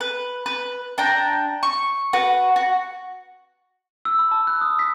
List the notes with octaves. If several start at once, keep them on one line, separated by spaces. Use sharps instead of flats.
B4
B4
D4 G5 A#5
C#6
F#4 B4
F#4
E6
B5
A5
F#6
D#6
B6